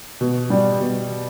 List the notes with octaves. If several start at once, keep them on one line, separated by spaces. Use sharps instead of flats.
B2
G3
B2